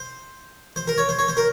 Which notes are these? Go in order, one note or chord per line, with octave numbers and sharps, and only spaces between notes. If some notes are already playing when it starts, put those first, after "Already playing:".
Already playing: C5
C5
A#4
C#5
C5
C#5
C5
A#4